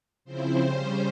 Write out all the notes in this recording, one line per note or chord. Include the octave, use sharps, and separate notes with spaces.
C#3 F3 C4 E4 C5
C#3 G3 C#4